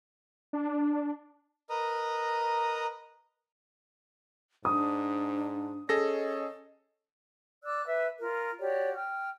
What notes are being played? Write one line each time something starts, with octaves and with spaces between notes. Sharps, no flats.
D4
A#4 B4 D#5 A#5 D#6
G#2 D4 D#6
C#4 G#4 A4 D#5 A#6
D5 D6 E6 F#6
B4 E5 E6
F4 A#4
F#4 G4 C#5 D5
G5 F6